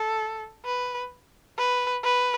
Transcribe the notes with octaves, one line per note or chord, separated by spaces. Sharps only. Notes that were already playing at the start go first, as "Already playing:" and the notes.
Already playing: A4
B4
B4
B4